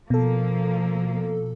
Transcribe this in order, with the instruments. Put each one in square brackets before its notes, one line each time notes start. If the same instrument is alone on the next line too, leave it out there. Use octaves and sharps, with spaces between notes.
[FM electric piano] B2 A4 [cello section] F3 A#3